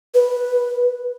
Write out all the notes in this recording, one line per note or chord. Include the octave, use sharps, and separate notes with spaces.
B4